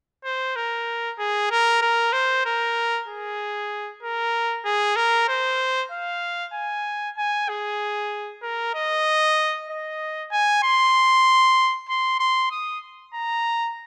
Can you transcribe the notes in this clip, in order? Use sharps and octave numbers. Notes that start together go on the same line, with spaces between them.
C5
A#4
G#4
A#4
A#4
C5
A#4
G#4
A#4
G#4
A#4
C5
F5
G#5
G#5
G#4
A#4
D#5
D#5
G#5
C6
C6
C6
D#6
A#5